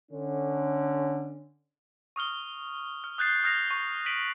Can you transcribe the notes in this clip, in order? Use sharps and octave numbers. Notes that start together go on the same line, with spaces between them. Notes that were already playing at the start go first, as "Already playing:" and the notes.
D3 C#4
C#6 D#6 F6 G7
F6
D#6 F#6 G6 A6 C7
D#6 F6 G6 A#6 C7 F7
C#6
B6 D7 D#7 F#7